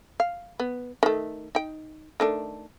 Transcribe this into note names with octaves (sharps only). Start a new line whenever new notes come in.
F5
B3
D#3 A3
D#4 G5
D#3 A3 D4